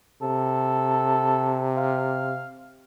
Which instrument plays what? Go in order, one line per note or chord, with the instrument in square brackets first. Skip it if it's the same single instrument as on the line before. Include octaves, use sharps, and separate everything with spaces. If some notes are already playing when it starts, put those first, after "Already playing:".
[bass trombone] C3 [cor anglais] A4
[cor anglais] F5